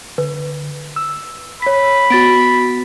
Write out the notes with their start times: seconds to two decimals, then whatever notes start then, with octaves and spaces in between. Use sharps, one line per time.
0.18 D3 B4
0.96 E6
1.62 C#5 B5 B6
2.10 B3 F#4 A6 D7